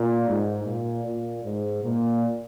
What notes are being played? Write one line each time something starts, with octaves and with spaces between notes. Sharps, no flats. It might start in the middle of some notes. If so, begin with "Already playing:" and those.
Already playing: A#2
G#2
A#2
A#2
G#2
A#2